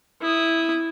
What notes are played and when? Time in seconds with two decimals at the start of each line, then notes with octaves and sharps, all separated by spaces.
0.21 E4 D#6